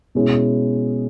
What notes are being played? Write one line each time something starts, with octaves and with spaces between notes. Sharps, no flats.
B2 G#3 C#4 E4